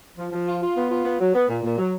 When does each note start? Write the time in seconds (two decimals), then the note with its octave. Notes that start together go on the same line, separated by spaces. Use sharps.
0.17 F3
0.32 F3
0.47 F4
0.61 F4
0.76 B3
0.90 F4
1.04 B3
1.20 F#3
1.34 B3
1.49 A#2
1.63 A#2
1.78 F#3